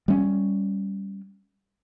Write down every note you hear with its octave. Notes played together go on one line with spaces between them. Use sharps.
G3 C#4